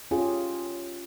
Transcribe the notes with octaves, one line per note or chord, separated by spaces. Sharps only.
C#4 F4 G4 G#4